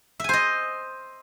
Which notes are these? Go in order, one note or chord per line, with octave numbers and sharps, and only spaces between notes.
C5 D#5 E5 G#5